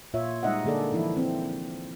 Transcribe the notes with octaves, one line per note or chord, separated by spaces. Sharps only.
A#2 F4 C#5 E5
G3 G#3 D#4 D#5 E5 F#5
D3 A#3 G#4 A4 D5
E3 F3 E4
C4